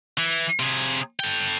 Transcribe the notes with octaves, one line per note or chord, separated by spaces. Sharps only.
E3
C3 G#4
A4 G5